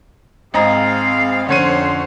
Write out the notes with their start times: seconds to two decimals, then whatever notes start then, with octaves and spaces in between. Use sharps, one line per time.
0.54 G#1 G#3 C4 D#5 F5 A#5
1.49 F2 D3 C#4 C5 C#5 D#7